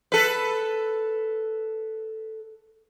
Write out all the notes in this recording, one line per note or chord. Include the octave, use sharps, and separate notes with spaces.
A4 B4